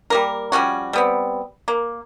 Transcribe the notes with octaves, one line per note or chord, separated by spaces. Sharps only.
G3 A#3 A#4
F3 G3 C#4 F#4
G3 B3 C4
A#3